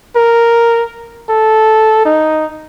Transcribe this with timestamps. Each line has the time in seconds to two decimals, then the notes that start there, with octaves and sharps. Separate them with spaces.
0.16 A#4
1.29 A4
2.06 D#4